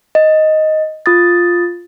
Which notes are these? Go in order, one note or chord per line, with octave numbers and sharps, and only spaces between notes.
D#5
F4 D#6 A6